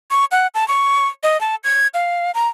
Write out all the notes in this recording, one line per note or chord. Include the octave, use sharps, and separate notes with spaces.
C#6
F#5
A5
C#6
D#5
A5
G#6
F5
A#5